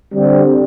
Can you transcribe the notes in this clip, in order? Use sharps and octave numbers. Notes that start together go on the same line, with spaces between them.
D3 G3 C4